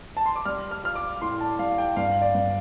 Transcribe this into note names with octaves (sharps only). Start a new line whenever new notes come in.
A5
C6
D6
G3 F6
F6
F4 F6
D6
A2 C6
A5
G3 F5
G5
G2 F5
D5
G2